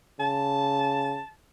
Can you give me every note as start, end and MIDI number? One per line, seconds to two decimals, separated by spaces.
0.20 1.21 49
0.20 1.27 81